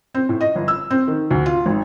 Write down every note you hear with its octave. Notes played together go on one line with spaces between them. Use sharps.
C4
A2
D#5
G1
E6
C4
D#3
D2
F4
G#1